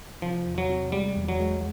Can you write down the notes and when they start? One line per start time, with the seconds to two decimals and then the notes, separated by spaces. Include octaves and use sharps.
0.22 C3 F3
0.46 E2
0.58 F#3
0.69 C3
0.92 G3 G#3
1.16 E2
1.29 F#3
1.40 G#3